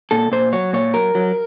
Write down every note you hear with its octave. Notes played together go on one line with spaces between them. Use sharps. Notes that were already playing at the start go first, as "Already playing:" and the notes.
A#2 A4
A#2 C5
F#3 C#5
A#2 C#5
F#3 A#4
F#3